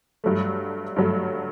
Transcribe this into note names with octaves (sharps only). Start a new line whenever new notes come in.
G2 F#3 A3
G2 F#3 A3